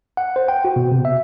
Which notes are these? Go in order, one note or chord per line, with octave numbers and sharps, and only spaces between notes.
F#5
C5
G5
F#4
B2
C3
E5